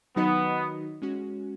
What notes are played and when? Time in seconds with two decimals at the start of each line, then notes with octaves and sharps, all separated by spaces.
0.16 D#3 F#3 B3 D#4 F#4 D#5
1.02 G#3 C#4 F#4